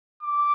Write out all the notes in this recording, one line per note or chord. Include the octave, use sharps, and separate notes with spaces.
D6